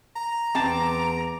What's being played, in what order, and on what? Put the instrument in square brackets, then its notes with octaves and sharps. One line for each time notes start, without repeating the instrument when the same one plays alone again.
[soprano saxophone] A#5
[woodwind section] E2 E3 D6 [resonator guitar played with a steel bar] C4 A5